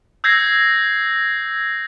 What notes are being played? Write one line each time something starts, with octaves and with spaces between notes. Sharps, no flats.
E6 G6 G#6 A#6 C7